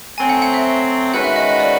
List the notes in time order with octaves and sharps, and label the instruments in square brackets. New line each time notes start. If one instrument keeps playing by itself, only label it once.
[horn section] F#3 A3 C4 [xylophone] G#5
[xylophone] F#5
F#5
E5
[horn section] D#3 G#3 C#4 F#4 B4 [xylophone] F#5
[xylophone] E5
D#5
D#5
D5